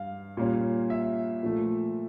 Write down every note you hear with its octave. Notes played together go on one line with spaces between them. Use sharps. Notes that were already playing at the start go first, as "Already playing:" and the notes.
Already playing: G2 F5
A#2 G3 A#3 C#4
E5
A#2 F3 A3